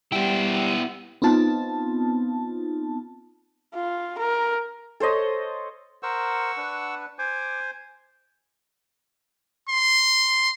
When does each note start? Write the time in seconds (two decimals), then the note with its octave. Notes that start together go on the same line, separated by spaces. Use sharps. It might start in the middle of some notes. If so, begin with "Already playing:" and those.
0.12 G3 B3 E4 G4 G5
1.22 B3 C4 D#4 F4 A5
3.74 F4
4.18 A#4
5.00 A4 C5 C#5 D#5
6.03 A#4 C5 F#5 C#6 E6
6.57 D4 B4
7.19 C5 G#5 D6
9.69 C6